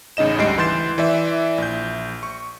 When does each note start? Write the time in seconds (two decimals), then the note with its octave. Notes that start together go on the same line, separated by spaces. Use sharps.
0.17 A1 C#3 D#4 D#5 E7
0.38 D2 G#2 G3 D#5 C7 D7
0.58 E3 C6 G6 A6 E7
0.98 E3 D5 E5
1.58 A#1 G6
2.23 C#6